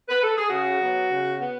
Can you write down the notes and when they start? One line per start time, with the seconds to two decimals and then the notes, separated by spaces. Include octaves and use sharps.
0.09 B4
0.23 A4
0.37 G#4
0.50 C#3 F#4
0.80 F#3 B3
1.12 C#3
1.41 B3